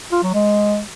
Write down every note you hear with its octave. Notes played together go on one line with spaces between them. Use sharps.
F4
F#3
G#3